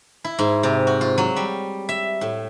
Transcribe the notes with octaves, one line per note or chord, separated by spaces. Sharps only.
E4
G#2
C3
F#4
F4
F#3
G3
E5
A2